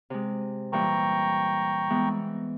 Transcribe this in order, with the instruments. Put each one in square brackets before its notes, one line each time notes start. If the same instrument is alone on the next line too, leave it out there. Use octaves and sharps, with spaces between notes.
[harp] C3 G#3
[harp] A#2 E3 G3 [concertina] G5 A#5 C#6
[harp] E3 G#3 B3